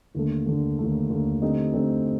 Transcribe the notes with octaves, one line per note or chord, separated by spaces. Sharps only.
D#2 D3 A3
D#2 D3 A3
D#2 D3 A3
D#2 D3 A3
D3 A3 C4 D#4 G4
D3 A3 C4 D#4 G4